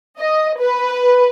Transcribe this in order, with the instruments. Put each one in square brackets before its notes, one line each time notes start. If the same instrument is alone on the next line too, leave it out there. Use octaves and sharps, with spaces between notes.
[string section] D#5
B4